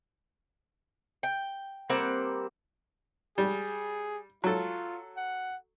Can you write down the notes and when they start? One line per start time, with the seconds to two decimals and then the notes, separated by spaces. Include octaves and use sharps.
1.23 G5
1.90 G3 A#3 C4 F#5
3.38 G3 G#4
4.44 F#3 F4 A4
5.17 F#5